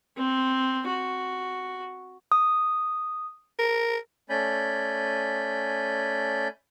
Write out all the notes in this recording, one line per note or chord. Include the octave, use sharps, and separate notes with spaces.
C4
F#4
D#6
A#4
A3 C#4 D5 G#5 B5 G6